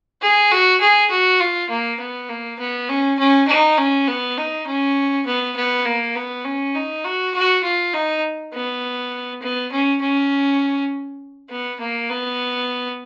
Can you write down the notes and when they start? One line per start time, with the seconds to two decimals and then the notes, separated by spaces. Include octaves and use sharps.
0.22 G#4
0.51 F#4
0.81 G#4
1.10 F#4
1.40 F4
1.70 A#3
2.00 B3
2.29 A#3
2.59 B3
2.89 C#4
3.19 C#4
3.48 D#4
3.78 C#4
4.08 B3
4.37 D#4
4.67 C#4
5.26 B3
5.56 B3
5.85 A#3
6.15 B3
6.45 C#4
6.75 D#4
7.04 F#4
7.34 F#4
7.64 F4
7.93 D#4
8.53 B3
9.42 B3
9.72 C#4
10.01 C#4
11.49 B3
11.80 A#3
12.10 B3